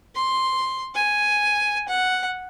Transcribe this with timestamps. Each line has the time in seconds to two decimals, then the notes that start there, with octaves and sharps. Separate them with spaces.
0.16 C6
0.95 G#5
1.88 F#5